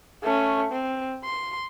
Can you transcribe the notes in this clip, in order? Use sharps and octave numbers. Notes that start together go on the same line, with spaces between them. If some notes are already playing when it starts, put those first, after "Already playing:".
A3 C#4
C4
C6